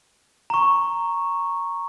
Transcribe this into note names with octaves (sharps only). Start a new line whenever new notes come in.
A#5 C#6